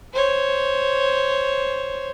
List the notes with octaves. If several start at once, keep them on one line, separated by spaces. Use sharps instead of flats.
C5 C#5